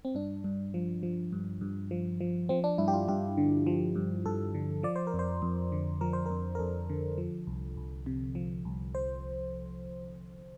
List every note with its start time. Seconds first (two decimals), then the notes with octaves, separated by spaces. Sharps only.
0.05 C4
0.15 G2 D4
0.44 G2
0.74 F3
1.03 F3
1.32 G2
1.61 G2
1.91 F3
2.21 F3
2.49 F3 C4
2.64 D4
2.78 G2 E4
2.88 G4
2.94 F4
3.08 G2 G4
3.37 D3
3.67 F3
3.96 G2
4.26 G2 A4
4.55 D3
4.83 F3 D5
4.96 C5
5.07 A#4
5.14 F2
5.19 C5
5.42 F2
5.72 D3
6.01 F3 A#4
6.13 C5
6.26 F2 A#4
6.55 A#4
6.59 F2 A4
6.90 D3
7.18 F3
7.47 C2
7.77 C2
8.06 C3
8.35 F3
8.65 C2
8.95 C5